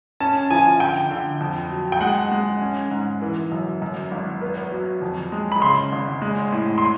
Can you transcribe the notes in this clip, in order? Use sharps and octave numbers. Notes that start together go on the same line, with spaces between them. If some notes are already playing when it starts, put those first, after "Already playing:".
C#4 A5
F3 G#5
D3 G5
D3
F2
F#3
G5
G#3 F#5
G#3
C#4
G#2
E3
F#2
F#2
G#1
B3
F#3
F2
G#3
B5
C#3 C6
G#1
G#3
A2
C6